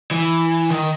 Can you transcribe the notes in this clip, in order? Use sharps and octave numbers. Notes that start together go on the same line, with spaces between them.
E3
D#3